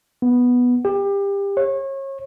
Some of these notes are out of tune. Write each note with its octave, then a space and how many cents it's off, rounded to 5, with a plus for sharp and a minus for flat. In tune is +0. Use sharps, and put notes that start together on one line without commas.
B3 -5
G4 +25
C#5 -30